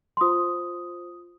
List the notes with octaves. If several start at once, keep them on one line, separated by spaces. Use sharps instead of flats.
C6
F4 C5 D#6